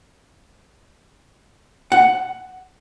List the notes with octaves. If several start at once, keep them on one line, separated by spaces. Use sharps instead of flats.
F#5